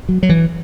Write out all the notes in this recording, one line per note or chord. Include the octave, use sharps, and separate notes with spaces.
F#3
F#3
E3